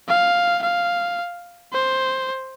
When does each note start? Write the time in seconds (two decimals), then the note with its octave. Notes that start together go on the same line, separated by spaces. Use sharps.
0.08 F5
0.63 F5
1.73 C5